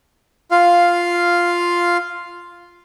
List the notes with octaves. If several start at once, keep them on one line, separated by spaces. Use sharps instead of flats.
F4 F5